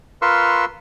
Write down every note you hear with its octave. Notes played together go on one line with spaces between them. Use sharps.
F4 A#4 B4 C6 C#6 E6